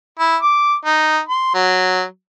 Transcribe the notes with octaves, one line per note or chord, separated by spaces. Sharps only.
E4
D6
D#4
C6
F#3